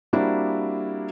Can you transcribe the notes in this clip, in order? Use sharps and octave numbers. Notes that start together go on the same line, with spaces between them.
G3 A#3 C4 D4 E4 F#4